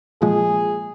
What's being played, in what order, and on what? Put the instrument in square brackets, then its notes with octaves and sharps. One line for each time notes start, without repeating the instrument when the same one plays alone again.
[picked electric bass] A#2 F3 G#3 [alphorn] G#4